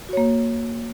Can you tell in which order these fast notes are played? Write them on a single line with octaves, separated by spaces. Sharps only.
F#4 C#5 A#3